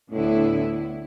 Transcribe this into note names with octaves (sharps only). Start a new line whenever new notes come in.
D2 A2 D3 B3 E4